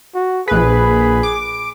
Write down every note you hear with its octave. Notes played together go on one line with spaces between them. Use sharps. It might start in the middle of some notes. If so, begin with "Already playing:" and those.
F#4
A#1 G#4 B4
D6